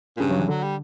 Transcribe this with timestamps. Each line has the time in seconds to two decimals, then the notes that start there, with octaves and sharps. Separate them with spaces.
0.17 A#2
0.20 G2 C#3
0.31 F#3
0.39 E3
0.48 D3 F#3
0.63 G3